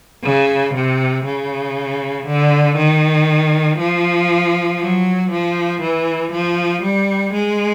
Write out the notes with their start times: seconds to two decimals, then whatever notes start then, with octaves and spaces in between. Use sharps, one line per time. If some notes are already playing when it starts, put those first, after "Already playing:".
0.24 C#3
0.74 C3
1.25 C#3
2.27 D3
2.77 D#3
3.79 F3
4.80 F#3
5.31 F3
5.82 E3
6.32 F3
6.83 G3
7.33 G#3